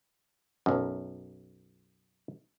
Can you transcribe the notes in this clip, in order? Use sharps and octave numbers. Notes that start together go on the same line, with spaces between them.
B1 F#2